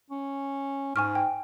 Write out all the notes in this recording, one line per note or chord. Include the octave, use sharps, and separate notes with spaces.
C#4
G#2 G#5 C#6 F6
G5